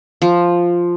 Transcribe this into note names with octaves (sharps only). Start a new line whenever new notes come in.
F3